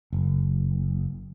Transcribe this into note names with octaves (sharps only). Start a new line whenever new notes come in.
F#1